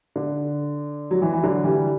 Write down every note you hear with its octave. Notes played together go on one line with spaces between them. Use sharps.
D3
F#3
E3
E3
D3 F#3
E3 G3